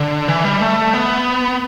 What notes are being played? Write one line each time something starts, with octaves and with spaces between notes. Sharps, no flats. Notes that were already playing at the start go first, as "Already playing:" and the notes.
Already playing: D3
E3
G3
A3
B3